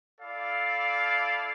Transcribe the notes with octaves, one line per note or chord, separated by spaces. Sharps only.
E4 A4 D5 F5